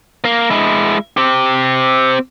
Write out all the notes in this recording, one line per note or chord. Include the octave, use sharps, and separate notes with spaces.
A#3
G#3 E4
C4 G4